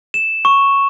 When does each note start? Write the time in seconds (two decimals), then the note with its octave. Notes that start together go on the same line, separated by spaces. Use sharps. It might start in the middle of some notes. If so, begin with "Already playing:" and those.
0.14 E7
0.45 C#6